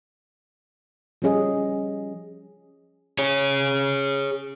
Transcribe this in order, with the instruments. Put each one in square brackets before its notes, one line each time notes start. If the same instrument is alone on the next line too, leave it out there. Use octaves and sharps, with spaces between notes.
[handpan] F3 G3 C#4 G#4 D#5
[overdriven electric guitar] G#4 C#5